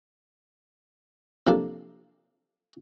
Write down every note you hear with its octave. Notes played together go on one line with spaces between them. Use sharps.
C3 F3 A#3 D4 A4